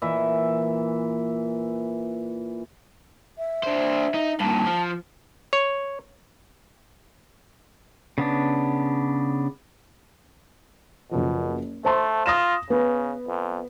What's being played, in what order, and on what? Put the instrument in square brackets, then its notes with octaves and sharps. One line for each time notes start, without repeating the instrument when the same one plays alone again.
[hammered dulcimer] A#2 E3 E5
[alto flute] E5
[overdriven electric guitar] D4 C5
D#4
[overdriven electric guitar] G2 A#2 [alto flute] A5
[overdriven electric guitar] F3
[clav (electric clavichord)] C#5
[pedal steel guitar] C#3 B3 D4
[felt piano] F#1 F3 [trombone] B2
[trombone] A3 [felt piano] C5 A5 C6
[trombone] F4 [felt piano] D#6 A#6 E7
[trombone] C#3 [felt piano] B3
[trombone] F2